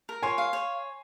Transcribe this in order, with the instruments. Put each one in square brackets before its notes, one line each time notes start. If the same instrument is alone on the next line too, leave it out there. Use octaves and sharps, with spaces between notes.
[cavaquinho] A#4
[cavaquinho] C#5 [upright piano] G#5 C6
[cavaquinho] F5
C#5